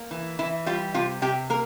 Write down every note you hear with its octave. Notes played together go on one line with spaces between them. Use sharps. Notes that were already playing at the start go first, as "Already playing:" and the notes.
Already playing: A#3
E3
E3 E4
G3 F4
C3 F4
C3 G4
A#3 A#4